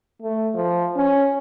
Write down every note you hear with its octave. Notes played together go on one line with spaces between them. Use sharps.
A3
F3
C#4